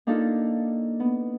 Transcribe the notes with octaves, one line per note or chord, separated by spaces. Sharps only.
A#3 D4 D#4 F4 A4
B3